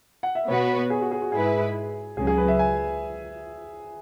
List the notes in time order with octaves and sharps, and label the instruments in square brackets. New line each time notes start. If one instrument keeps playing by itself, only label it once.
[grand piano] F#5
E5
[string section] B2 B3 F#4 B4 [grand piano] C#5
[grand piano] G#4
F#4
G#4
F#4
[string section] G#2 G#3 E4 B4 [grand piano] G#4
[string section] C#2 C#3 F#3 [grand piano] G#4
[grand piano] G#4
B4
E5
G#5